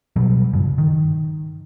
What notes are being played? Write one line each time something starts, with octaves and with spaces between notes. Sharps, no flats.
B2 F#3 G3
G2 C#3
D#3